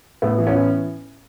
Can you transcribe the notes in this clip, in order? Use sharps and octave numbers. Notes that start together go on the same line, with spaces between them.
A2 A3 B3
E3
B3 C#4
E3